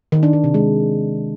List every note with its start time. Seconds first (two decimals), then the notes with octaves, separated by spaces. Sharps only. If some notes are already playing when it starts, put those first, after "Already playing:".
0.12 D#3
0.23 D4
0.33 D#3
0.44 C3
0.54 G#3